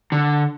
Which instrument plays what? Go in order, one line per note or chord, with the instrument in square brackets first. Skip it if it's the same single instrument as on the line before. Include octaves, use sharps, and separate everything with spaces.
[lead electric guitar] D3